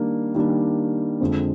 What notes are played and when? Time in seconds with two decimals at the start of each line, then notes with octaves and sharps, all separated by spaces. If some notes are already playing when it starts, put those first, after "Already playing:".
Already playing: D#3 G3 A#3 D4
0.35 D#3 G3 A#3 D4
1.21 F2 D3 G#3 C4